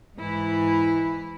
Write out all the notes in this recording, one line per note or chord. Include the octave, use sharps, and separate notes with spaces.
G#2 E3 E4